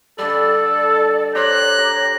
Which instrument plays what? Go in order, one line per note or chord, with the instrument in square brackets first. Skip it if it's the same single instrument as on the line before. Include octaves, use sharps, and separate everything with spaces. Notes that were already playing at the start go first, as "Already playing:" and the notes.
[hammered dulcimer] D3 G3 [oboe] A4 [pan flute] D5
[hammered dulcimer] G4 C5 [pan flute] C#5 [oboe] A#5 [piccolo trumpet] F#6
[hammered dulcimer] G4 [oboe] A#5